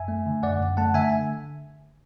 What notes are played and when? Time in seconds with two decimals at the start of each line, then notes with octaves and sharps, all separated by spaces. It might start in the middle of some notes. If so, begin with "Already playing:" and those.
Already playing: F#2 E5 G#5
0.08 A3
0.26 D3
0.42 F#2 D5 F#5
0.61 F#2
0.77 A3 F#5 A5
0.94 D3 E5 G#5